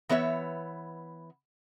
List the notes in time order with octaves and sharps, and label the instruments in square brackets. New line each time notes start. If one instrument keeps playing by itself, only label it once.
[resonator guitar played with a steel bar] E3 B3 C#5 E5